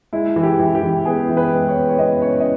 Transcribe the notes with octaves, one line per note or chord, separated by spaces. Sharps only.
G#3 E4
E3
G4
E3
G4
E3
B3 G#4
E3
B4
G#3
C#5
B3
C#5
B3 D#5
C#3 C#5
D#5